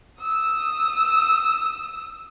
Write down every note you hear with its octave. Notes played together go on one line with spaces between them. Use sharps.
D#6 E6